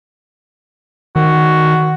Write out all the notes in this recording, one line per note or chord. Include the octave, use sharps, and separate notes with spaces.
D#3 F#4